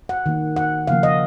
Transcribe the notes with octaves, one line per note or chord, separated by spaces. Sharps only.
F#5
D#3 A#3
F#5
C#3 F3 A#3 F5
D#5